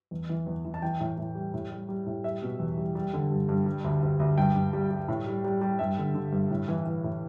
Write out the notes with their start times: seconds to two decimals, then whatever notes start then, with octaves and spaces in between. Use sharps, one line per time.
0.11 E2
0.29 E3
0.46 E2
0.65 E3
0.74 A5
0.82 E3 G5
1.00 A2
1.18 A2
1.35 G3
1.54 A2
1.71 G3
1.89 G3
2.06 A2
2.24 G3 E5
2.42 B2
2.59 E2
2.78 G3
2.95 G3
3.13 D3
3.31 G2
3.49 G2
3.66 G3
3.84 D2
4.02 D2
4.20 D2
4.38 G2 G5
4.56 G2
4.73 G3
4.91 G3
5.08 A2
5.27 G3
5.44 G3
5.61 G3
5.79 G2 E5
5.98 D3
6.14 D3
6.32 G2
6.51 A2
6.68 E3
6.86 E3
7.04 A2